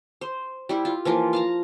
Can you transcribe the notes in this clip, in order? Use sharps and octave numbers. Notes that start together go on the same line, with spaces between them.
C5
G3 E4 G4
F4
E3 F3 A#3 F4
F5 A5 A#5